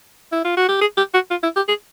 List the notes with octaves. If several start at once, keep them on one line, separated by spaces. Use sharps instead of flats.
E4
F4
F#4
G4
G#4
G4
F#4
F4
E4
G4
G#4